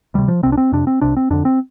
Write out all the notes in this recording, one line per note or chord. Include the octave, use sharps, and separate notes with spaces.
D2 C3 G3
F3
C2 C3 C4
D4
C4
F2 C3 D4
C4
C2 C3 D4
C4
F2 D3 D4
C4